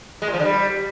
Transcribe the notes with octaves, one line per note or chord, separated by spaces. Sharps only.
G#3
A#2
F3
D3
G3